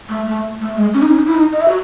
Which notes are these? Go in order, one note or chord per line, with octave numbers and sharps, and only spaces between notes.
A3
A3
A3
G#3
C#4
D#4
C#4
D#4
E4
D#4
D#5
E5
F#4